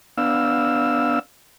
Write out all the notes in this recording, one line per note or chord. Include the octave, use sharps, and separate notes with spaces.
B3 D4 F5 E6